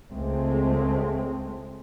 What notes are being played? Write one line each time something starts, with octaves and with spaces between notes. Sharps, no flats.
C#2 G#3 A3 C4